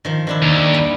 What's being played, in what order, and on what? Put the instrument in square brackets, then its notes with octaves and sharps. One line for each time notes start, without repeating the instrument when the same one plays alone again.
[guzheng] D#3 F3
D#3 D4 E4
[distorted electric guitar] D#2
[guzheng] G3